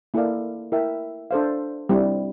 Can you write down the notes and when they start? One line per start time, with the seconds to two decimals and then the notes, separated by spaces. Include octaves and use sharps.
0.14 A#3 E4 A4 D5 F5
0.72 E4 A#4 E5 G5
1.31 D4 A4 C5 F5
1.89 G3 C4 E4